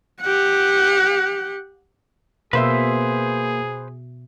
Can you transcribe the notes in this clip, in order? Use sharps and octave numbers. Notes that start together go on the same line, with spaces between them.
G4 F#5
B2 A#3 G#4 B4 C5 E5